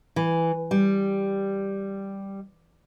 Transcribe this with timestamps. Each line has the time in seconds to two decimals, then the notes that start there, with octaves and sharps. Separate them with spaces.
0.16 E3
0.71 G3